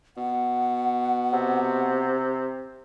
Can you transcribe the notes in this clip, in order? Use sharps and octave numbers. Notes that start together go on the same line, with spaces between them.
B2 F#5
C3